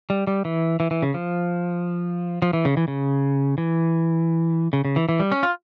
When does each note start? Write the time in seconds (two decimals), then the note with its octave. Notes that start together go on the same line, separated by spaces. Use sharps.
0.10 G3
0.27 G3
0.45 E3
0.80 E3
0.91 E3
1.02 C#3
1.14 F3
2.42 F3
2.53 E3
2.65 C#3
2.77 E3
2.88 C#3
3.58 E3
4.73 C#3
4.85 C#3
4.96 E3
5.09 E3
5.20 G3
5.32 C#4
5.43 F4